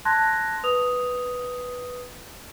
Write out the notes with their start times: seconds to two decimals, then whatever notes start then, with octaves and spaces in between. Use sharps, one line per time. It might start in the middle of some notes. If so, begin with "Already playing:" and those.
0.05 A5 C6 F#6 G#6 A#6
0.64 B4 D#6 F7